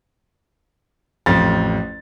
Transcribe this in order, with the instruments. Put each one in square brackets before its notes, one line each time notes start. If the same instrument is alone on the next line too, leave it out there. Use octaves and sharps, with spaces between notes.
[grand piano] A1 A6 [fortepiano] F2